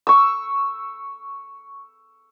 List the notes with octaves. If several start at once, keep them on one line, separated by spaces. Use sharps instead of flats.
C#6 E6